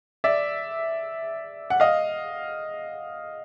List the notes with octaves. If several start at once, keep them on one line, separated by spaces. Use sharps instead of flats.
D5 E5
F#5
D#5 F5